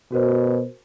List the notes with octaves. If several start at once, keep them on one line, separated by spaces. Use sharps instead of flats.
B2 F#4 A#4 C5